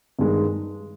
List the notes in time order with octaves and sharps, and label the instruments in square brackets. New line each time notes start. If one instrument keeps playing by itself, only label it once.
[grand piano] G2 D#3 G#3